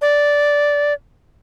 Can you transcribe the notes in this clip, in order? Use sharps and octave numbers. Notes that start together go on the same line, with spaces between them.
D5